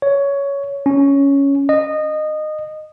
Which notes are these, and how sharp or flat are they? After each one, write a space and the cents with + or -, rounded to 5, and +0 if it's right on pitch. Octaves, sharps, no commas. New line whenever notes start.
C#5 +10
C#4 +5
D#5 -20